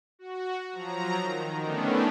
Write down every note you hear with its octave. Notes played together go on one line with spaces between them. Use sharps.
F#4
F3 F#3 A#5
D#3
D3 D#3 A3 B3 C#4 D4